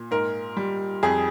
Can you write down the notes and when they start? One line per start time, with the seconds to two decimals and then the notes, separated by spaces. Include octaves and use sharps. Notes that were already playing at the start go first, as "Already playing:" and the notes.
Already playing: A#2
0.11 G#2 A#4
0.57 G3
1.03 F2 G#4